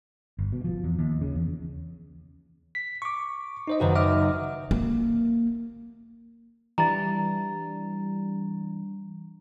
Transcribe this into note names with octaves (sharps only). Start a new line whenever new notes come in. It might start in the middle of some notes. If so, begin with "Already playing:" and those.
G1
B2
F3
E2
D#2
C#3
E2
B6
C#6 D6
D#4 C5 D#5
F#1 F#2 D#3 F#4 B4 C5
D#5 E5 D6 F6
A#3
E3 G3 D4 A#5 A6